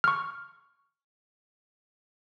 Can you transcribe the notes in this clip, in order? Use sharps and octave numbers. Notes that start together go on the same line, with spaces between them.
C#6 F6